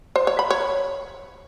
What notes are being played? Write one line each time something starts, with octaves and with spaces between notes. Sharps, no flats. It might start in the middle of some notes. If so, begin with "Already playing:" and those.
C5
C#5
B5
C#5